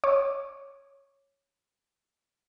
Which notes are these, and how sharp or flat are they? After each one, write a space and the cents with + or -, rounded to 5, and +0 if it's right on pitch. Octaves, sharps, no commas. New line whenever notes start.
C#5 +0 D6 +0